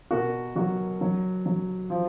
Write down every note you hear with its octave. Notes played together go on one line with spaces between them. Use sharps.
B2 F#4 A#4
F#3 F#4
F#3
F#3
F3